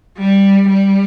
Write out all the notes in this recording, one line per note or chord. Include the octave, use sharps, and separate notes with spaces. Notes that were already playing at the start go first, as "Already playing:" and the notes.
G3
G3